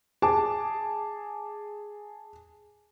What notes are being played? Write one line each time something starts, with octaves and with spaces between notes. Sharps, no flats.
G#4 A5 D6